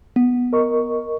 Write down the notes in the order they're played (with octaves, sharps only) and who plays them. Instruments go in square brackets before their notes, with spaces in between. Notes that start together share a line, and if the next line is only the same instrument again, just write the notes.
[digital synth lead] B3
[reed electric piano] A#4 D#5 C#6